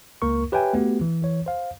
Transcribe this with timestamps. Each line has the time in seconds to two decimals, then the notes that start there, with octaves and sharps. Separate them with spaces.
0.22 C#2 A#3 A#4 C#6
0.52 G4 B4 C#5 E5 G5 G#5
0.73 A3 B3 F#4 G4
1.01 E3
1.22 E3 C#5
1.46 C5 F5